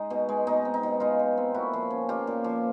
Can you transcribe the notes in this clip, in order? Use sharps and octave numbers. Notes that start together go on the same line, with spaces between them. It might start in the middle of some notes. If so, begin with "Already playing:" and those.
Already playing: G#3 D#4
B2
G#3
B2 D#4
C4
D#4
B2
G#3 D#4 F4
B2
C4
A#2 E4 F#4
F3
C#4
A#3 F4 G4
A#2
F3